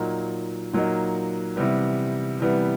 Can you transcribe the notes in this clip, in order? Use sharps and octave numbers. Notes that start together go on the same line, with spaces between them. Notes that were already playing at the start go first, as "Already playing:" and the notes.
Already playing: A#2 F#3 A#3 D#4
A#2 F#3 A#3 D#4
C3 E3 G3 B3
C3 E3 G3 B3